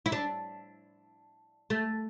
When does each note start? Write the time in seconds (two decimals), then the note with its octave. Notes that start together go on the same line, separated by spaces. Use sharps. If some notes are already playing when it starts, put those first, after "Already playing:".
0.06 E4
0.12 D4
1.70 A3